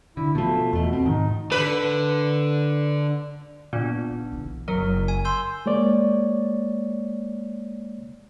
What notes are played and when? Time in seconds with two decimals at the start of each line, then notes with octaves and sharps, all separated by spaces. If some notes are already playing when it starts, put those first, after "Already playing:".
0.17 D3 E4
0.35 B2 F3 A3
0.73 E2 B2 A3
0.93 C4
1.06 G#2 D#3 D#4
1.52 D3 B4
3.73 A#2 B3 D4
4.11 D#4
4.32 B1 E3
4.68 F#1 F#3 A#4
5.08 G#5
5.25 C6 E6 G6
5.66 G#3 A#3 C#5 D5